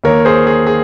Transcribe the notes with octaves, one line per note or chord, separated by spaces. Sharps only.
D#2 D#3 A#3 A#4 C#5
G#4 C5
G#4
G#4